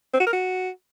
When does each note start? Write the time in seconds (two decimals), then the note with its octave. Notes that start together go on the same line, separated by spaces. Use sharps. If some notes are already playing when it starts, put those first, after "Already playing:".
0.14 C4
0.20 F#4
0.26 A#4
0.33 F#4